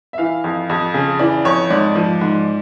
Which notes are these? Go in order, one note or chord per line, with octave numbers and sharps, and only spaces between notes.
E5
E3 F5
F2
F2
C#3
E3 D5
F2 C#5
G#2 D5
F3
G#2